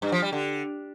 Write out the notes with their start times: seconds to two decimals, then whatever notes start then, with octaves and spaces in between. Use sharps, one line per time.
0.02 G2
0.12 F3
0.22 G3
0.33 D3